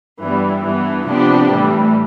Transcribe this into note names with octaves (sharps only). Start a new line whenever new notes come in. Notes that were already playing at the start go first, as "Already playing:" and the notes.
G2 E3 G3 B3
G2 E3 B3
C3 F3 B3 D4 G4
A2 E3 G3